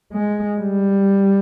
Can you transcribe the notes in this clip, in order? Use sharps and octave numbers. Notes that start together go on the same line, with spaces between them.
G#3
G3